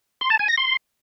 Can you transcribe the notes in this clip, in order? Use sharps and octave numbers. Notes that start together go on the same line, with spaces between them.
C6
A5
G#5
A#6
C6